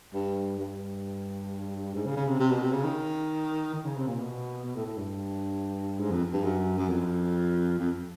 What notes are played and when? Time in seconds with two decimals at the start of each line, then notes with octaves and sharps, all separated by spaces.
0.14 G2
0.58 G2
1.95 G#2
2.05 C#3
2.16 C#3
2.28 C3
2.39 C3
2.50 B2
2.62 C3
2.72 C#3
2.84 D#3
3.74 D#3
3.85 C#3
3.97 C3
4.07 A#2
4.19 B2
4.65 B2
4.75 A2
4.86 A2
4.98 G2
5.99 G#2
6.11 F2
6.33 G2
6.44 F#2
6.78 F#2
6.89 F2
7.79 F2